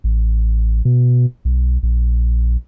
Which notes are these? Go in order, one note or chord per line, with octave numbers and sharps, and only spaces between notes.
A1
B2
B1
A#1